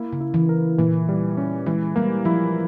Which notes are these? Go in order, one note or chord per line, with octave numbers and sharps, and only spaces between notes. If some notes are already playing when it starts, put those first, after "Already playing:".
Already playing: A#3 E4
C#3
E4
E3
A#4
A#2 E3 A#3
G3
C#4
E3 G#3
G3 A#3
F3 E4